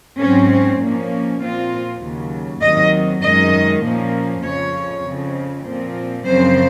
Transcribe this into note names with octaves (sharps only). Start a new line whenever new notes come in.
G#2 F#3 C4 C#4
A#2 F3 A#3 C#4
A#2 F3 C4 F4
D#2 C#3 F#3
D#2 D#3 F#3 C4 D#5
F#2 D#3 G#3 D#5
A#2 F3 A#3 C#4
F2 C#3 F3 C#5
F2 C#3 F3 C4
A#2 F3 C4
F#2 C#3 F3 C4 C5